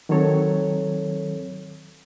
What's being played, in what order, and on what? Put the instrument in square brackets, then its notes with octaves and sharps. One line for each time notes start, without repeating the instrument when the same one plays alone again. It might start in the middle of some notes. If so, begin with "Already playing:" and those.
[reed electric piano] D#3 F#3 C4 A4 C#5